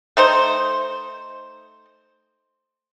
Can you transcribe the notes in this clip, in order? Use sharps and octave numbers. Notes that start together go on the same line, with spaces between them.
A3 D#4 C5